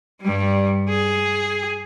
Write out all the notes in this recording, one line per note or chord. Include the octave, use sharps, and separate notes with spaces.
G2 G3
G#4